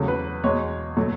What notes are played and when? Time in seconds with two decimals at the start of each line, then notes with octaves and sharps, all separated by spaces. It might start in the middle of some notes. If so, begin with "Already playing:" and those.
Already playing: E2 C#3 F#3 A3
0.08 B4
0.44 E2 B2 G#3 C#5
0.97 B2 F#3 A3